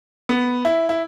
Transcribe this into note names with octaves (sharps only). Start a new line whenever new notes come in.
B3
E4
E4